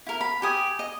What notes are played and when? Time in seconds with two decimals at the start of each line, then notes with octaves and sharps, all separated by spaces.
0.06 E4 A#4
0.21 B5
0.42 G4 G#5 D#6
0.79 D#5